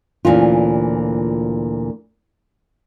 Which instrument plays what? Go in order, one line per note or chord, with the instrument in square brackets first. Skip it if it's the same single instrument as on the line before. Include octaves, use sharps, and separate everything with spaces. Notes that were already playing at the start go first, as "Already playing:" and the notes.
[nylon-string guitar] D2 G2 A#2 E3 C#4 F4